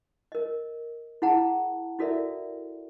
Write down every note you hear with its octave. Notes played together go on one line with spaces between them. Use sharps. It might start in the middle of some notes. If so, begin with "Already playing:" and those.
A#4 D#5
E4 G#4 F#5 A5 A#5
E4 F#4 A4 A#4 D5 E5